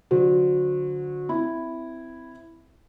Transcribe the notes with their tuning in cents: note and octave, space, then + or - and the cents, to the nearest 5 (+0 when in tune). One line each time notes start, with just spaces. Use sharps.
D3 +0 F#3 -25 C5 +0
C4 -20 E4 +0